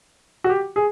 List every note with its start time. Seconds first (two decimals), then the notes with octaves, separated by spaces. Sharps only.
0.44 F#4
0.49 G4
0.76 G#4